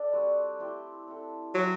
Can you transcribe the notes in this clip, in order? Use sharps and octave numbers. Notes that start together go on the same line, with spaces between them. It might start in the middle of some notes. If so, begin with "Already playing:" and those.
Already playing: D4 A4 D5
G3 C4 F#4 B4
A3 E4 G4 C5
C4 E4 A4
F#3 C4 E4 B4 E5